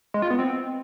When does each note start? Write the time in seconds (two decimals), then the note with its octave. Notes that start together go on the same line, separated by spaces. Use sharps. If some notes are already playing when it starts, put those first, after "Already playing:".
0.14 G#3
0.22 F4
0.30 B3
0.39 C4